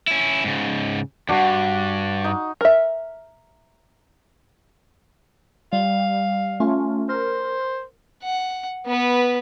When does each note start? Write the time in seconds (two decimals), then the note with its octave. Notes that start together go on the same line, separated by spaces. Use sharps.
0.08 C#4 E4
0.44 G#2 C#3
1.29 E2 G2 D4 F#4
2.24 D#4
2.61 A#4 E5
5.73 G3 F5
6.60 A3 C#4 F4
7.09 A#4 C5
8.23 F#5
8.86 B3 B4